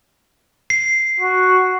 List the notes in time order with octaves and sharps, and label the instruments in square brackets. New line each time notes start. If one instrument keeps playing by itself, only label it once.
[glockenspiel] C7
[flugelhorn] F#4